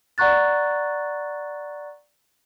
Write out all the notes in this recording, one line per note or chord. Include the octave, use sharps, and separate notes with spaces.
D5 F#5 A#5 C#6 F#6 A6